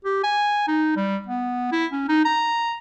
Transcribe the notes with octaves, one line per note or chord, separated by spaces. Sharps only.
G4
G#5
D#4
G3
B3
E4
C#4
D#4
A#5